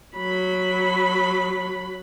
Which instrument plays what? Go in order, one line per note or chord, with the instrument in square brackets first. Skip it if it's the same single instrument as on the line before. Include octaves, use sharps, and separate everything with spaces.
[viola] F#3 B5